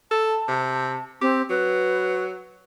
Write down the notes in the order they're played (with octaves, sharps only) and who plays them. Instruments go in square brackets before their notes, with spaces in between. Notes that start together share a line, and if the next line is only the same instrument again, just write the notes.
[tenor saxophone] A4 [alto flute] A5
[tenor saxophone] C3
[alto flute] C4 [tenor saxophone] G4
[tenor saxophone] F#3 [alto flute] B4